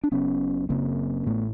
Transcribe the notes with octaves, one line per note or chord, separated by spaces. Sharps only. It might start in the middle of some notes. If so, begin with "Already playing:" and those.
D4
F#1 F#2 C#3 B3 C#4
F#1 F#2 C#3 A#3 C4
A1 A2 A3 B3